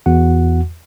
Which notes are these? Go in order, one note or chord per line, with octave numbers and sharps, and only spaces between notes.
E2 F#4 F#5